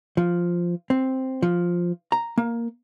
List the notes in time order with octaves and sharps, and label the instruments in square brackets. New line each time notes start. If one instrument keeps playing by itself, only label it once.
[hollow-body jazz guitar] F3
C4
F3
A#5
A#3